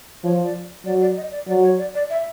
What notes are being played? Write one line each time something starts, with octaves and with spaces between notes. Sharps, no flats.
F3 C#5
D5
F#3 D5
D5
D#5
D5
F#3 D5
C#5
D5
D5
E5